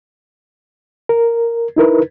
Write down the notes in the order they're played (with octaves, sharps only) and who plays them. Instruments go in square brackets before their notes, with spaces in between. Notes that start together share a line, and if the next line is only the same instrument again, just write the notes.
[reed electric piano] A#4
D#4 E4 A#4 B4